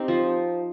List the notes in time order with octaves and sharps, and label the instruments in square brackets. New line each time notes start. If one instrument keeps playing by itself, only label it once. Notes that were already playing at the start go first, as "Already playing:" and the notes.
Already playing: [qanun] C4 D#4 G4
F3